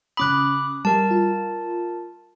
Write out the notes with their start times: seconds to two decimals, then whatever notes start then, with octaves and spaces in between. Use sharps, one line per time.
0.17 C#3 C#4 B5 D6 D#6 F#6
0.85 G3 A#4 A5
1.11 F4